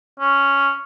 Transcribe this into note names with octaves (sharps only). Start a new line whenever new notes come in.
C#4